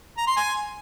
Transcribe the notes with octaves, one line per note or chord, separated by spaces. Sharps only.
A#5
C6
G#5